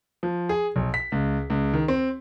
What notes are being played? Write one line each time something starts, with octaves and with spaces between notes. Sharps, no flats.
F3
G#4
B1
B6
C#2
C#2
D#3
C4